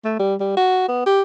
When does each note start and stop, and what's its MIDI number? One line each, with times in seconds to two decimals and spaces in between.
0.05 0.15 57
0.19 0.35 55
0.40 0.57 55
0.57 0.88 66
0.89 1.02 59
1.06 1.22 67